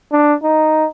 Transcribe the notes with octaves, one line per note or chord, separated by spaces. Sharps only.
D4
D#4